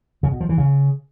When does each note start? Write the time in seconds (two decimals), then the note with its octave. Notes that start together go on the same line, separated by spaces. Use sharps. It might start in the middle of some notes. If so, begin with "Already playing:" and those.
0.23 C#3
0.32 B2
0.41 F3
0.49 E3
0.58 C#3